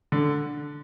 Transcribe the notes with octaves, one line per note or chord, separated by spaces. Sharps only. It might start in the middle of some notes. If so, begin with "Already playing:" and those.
D3